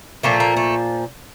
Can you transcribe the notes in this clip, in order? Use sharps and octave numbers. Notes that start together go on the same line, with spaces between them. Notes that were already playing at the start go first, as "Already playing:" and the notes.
A#2 F3 A3 A#3
A#3
A3